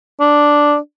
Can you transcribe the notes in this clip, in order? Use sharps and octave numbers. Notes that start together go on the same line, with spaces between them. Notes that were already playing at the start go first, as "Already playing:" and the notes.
D4